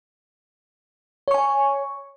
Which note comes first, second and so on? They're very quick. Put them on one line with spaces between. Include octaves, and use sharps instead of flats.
C#5 C#6 G#5